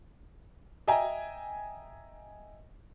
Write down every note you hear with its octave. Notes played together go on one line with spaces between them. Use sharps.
D#5 E5 G5 G#5 A#5